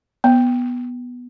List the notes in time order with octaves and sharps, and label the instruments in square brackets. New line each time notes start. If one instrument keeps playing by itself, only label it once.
[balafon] B3